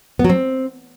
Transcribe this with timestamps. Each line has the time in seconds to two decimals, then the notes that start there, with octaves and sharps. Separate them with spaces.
0.19 B3
0.24 F#3
0.29 C4